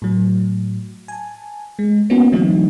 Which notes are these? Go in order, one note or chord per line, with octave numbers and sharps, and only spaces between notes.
A2 F#3
G#5 A5
G#3
A#3 B3 C#4 E4 F#4
D3 E3 F#3 A3 C4 D#4